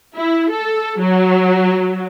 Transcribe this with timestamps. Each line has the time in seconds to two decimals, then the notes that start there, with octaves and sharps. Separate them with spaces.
0.16 E4
0.53 A4
1.01 F#3